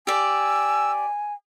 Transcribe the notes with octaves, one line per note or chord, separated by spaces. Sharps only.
G4 D5 G#5 E6